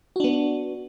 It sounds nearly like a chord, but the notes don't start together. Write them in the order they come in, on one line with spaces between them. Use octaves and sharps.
F#4 D4 B3